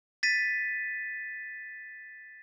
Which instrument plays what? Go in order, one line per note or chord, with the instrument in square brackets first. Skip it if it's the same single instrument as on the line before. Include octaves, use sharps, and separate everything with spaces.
[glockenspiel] A6 B6 D#7